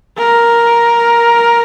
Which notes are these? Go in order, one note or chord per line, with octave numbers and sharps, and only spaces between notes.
A#4